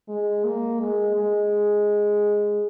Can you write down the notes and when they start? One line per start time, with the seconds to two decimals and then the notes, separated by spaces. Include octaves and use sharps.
0.08 G#3
0.44 A#3
0.80 G#3
1.15 G#3